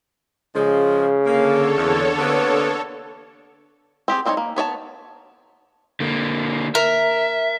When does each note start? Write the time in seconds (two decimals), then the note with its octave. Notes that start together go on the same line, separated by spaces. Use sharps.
0.56 C#3 F3 G#3
1.26 D3 A#3 A4 C#5
1.77 E2
2.18 C3 A#3 B3
4.08 C4 G4 G#4
4.26 G3 C4 D4 D#4 C#5
4.37 A#3
4.56 B3 C#5 D5 A5
6.00 D3 A#3
6.75 A#4 E5